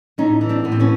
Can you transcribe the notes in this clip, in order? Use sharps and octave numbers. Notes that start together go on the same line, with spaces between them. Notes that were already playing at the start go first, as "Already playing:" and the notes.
A2 C#4 D#4
E3
C4 D4
A2 B3
C4
B3 C#4